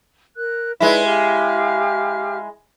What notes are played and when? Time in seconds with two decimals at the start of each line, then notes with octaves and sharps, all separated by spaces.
0.36 A#4 F#6
0.80 G#3 D#4 E4 B4 D5
1.05 G4 F5 F6